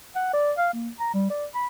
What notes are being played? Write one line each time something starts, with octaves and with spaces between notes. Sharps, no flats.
F#5
D5
F5
A#3
A#5
G3
D5
B5